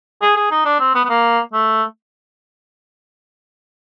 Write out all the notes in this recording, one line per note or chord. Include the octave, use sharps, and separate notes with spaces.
G#4
G#4
D#4
D4
C4
B3
B3
A#3
A3